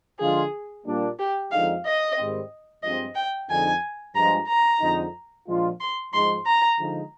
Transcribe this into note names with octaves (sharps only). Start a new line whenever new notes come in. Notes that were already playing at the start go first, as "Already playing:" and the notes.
D3 F3 G#3 D4 F4 G#4
A#2 G3 A#3 D4
G4
F2 D3 G#3 D#4 F5
D#5
G#2 D#3 G3 C4
G2 F3 G#3 C4 D#5
G5
F2 D3 G#3 D#4 G#5
G2 F3 G#3 A#5
A#5
F2 D3 G#3 D#4
A#2 F3 G#3 D4 F4
C6
G#2 F3 G#3 D#4 C6
A#5
D3 F3 G#3 D#4